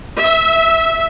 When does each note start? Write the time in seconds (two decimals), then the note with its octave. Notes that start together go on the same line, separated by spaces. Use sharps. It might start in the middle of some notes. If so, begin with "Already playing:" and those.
0.22 E5